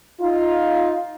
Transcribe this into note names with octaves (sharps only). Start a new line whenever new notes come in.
D#4 F4